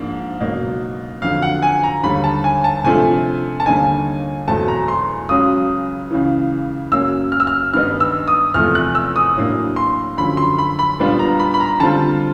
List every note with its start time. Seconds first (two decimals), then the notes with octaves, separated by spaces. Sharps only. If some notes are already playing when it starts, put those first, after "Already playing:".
Already playing: G#2 F3 A#3 D4
0.40 C#2 B2 F#3 A#3 D#4
1.22 F2 D3 F#3 F5
1.42 F#5
1.63 G#5
1.83 A#5
2.03 D#2 D3 G3 B5
2.24 A5
2.44 G#5
2.64 A5
2.84 C3 F3 A3 D4 F4 G#5
3.60 A5
3.66 D#2 D3 G3 A#3 D#4 G#5
4.47 E2 B2 F#3 A3 C4 A5
4.68 A#5
4.88 C6
5.29 C#2 C#3 F#3 D#6
6.11 C#2 C#3 E3
6.92 F#2 C#3 F#3 A#3 C#4 E6
7.32 F6
7.40 E6
7.47 F6
7.73 G2 D#3 G3 B3 D#4 F6
8.00 E6
8.28 D#6
8.54 E2 C3 F3 A3 F6
8.75 F#6
8.95 E6
9.16 D#6
9.36 A2 F#3 A#3 D4
9.76 C6
10.17 F#2 D3 F3 B5
10.37 C6
10.58 B5
10.79 B5
10.99 A#2 G3 B3 D4 F4
11.19 A#5
11.39 B5
11.54 B5
11.60 A#5
11.80 D3 G3 C4 F4 A5